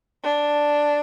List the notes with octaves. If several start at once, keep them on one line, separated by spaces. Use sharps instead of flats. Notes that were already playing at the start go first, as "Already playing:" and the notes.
D4